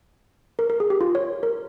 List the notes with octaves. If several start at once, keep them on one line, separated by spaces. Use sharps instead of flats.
A#4
A#4
G#4
G4
F4
C#5
A#4